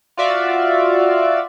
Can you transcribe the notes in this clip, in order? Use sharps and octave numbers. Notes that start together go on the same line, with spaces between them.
F4 F#4 D5 E5 F5